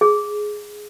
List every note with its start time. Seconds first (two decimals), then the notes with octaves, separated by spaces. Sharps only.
0.01 G#4